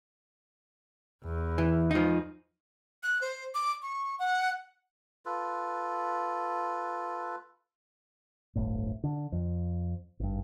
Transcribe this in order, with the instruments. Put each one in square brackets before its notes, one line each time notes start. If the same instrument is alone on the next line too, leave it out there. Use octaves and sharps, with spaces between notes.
[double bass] E2
[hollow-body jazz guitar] E3
F3 D#4
[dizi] F#6
C5
D6
C#6
F#5
[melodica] F4 A4 B4
[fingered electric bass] D1 G1 A2
D3
F2
G#1 G2